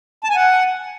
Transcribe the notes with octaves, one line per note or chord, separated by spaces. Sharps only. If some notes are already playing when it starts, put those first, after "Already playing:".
A5
G#5
F#5